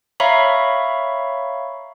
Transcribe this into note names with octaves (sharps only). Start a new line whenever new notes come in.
C#5 E5 F5 A#5 B5 C#6